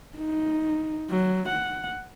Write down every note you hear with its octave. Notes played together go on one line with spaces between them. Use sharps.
D#4
F#3
F#5